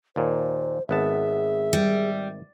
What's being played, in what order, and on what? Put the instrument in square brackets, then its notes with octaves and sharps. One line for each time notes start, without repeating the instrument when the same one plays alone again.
[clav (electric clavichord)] D#2 A#2 [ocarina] C5
[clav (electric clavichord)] G#1 B3 A5 [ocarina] G#4 [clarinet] E5
[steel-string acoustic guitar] G3